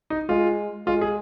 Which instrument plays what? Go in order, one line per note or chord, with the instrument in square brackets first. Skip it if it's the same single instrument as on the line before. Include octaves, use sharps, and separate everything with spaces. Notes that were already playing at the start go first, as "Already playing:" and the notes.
[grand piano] D#4
[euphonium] G#3 [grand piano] F4
[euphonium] G#3 [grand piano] F4
[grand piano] G#4